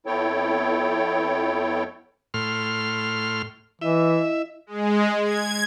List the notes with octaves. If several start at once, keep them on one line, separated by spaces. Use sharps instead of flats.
F2 B3 E4 A4 C#5 G5
A2 C6 F6
E3 E4 D#5 E5
G#3
G#6